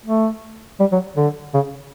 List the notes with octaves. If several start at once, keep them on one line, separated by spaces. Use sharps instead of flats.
A3
G3
F#3
D3
C#3